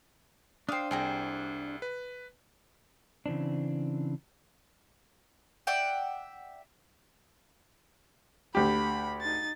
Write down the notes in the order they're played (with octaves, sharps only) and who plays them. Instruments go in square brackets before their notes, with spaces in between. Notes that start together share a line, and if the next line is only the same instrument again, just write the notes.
[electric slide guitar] D4 C5 [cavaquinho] F5 G5 [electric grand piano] D#6 C7
[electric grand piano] C2 [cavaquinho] G#4 G5 A#5
[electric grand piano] B4
[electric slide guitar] C#3 E3 C4 D4
[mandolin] D5 E5 F#5 G5
[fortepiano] D2 G4 [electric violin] B5
[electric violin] D#4 A6